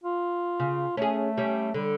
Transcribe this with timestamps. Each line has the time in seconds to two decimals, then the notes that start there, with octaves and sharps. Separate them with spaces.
0.03 F4
0.60 C#3
0.97 A3 C#4 G#4
1.38 G3 C#4
1.74 D3 G3